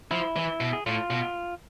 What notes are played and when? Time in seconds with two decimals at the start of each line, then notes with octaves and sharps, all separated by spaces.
0.11 F3 E4
0.37 E3
0.61 B2
0.73 G#4
0.86 A2 F4
1.10 B2